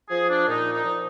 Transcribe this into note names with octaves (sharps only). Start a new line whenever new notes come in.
F3 G#4
D4
A#2 D#4
D#4
F3